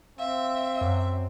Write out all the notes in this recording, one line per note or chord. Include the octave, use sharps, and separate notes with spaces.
C4 E5 F5
F#2